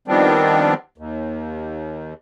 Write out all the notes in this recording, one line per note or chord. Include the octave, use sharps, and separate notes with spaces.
D#3 F3 G3 B3 C4 D4
D#2